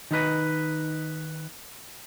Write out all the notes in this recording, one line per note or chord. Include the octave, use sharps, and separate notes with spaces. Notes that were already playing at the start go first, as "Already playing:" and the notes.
D#3 D#4 B4 D#5